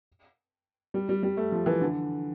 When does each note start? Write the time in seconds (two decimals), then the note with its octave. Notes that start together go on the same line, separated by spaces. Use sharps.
0.94 G3
1.09 G3
1.23 G3
1.37 A3
1.52 F3
1.66 E3
1.81 D3